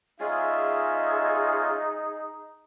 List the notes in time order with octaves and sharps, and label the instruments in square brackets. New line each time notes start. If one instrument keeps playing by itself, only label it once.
[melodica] G#3 C#4 F4 [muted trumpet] D#4 [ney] G#4 [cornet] E5